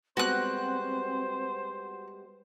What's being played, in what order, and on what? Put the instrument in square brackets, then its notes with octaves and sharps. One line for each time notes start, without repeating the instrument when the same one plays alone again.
[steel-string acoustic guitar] G3 G#3 B3 [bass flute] C4 [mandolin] F#4 F#6 [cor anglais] C5